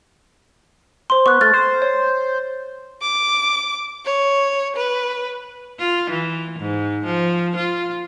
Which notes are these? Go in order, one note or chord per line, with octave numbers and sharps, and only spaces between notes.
C5 C6
B3 C#6 F#6
A3 F6 A6
C5
C#5
D6
C#5
B4
F4
E3
G#2
F3
F4